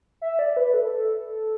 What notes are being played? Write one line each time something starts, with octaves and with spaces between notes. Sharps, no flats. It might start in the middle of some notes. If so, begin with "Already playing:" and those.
E5
D5
B4
A4